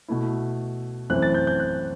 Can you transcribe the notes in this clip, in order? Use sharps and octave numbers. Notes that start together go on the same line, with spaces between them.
B2 A3 E4
F#2 E3 A3 C4 E4 F#6
A6
G6
G6
F#6